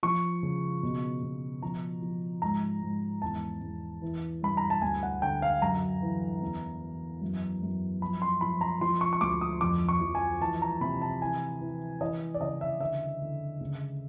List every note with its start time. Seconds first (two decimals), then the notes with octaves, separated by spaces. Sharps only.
0.03 F3 C#6
0.43 C#3
0.83 B2
1.23 B2
1.62 F3 A#5
2.02 F3
2.42 G#2 A#5
2.82 G#2
3.22 E2 A5
3.62 E2
4.02 E3
4.42 G2 B5
4.57 A#5
4.70 A5
4.82 D2 G#5
5.03 F#5
5.22 D3 G5
5.42 F5
5.62 F#2 A#5
6.02 E3
6.41 E2
6.81 E3
7.22 F#2
7.62 F#2
8.01 F3 B5
8.22 C6
8.41 F3 B5
8.61 A#5
8.81 F3 C6
9.01 C#6
9.13 C#6
9.21 D2 D6
9.41 D#6
9.61 F2 D6
9.89 C#6
10.01 F3
10.15 G#5
10.41 E3 A5
10.62 A#5
10.81 C3 B5
11.02 A5
11.21 E3 G#5
11.61 E3
12.01 E3 D#5
12.34 D5
12.41 C#3 D#5
12.61 E5
12.80 D3 E5
13.22 D3
13.61 C#3